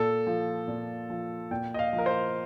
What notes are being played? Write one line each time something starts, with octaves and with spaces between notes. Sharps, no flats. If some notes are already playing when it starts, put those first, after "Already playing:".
Already playing: A#2 A4
F3
A#2
F3
A#2 G5
D#5
F5
F3
A#4
C5